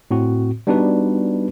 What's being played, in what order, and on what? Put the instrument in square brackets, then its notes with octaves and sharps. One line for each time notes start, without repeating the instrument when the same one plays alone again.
[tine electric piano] A2 C4 F#4
G3 B3 D4 D#4 F#4 B4